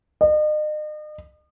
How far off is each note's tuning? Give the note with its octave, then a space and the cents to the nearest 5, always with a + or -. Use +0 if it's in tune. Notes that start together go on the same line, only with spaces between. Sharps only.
D#5 -40